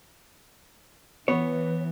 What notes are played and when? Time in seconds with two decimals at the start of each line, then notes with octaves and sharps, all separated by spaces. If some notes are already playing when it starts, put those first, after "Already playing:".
1.28 E3 B3 B4 C#5